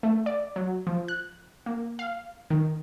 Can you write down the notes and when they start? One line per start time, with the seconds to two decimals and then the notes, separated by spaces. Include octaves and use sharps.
0.03 A3
0.26 D5
0.56 F#3
0.87 F3
1.08 F#6
1.66 A#3
1.99 F5
2.50 D#3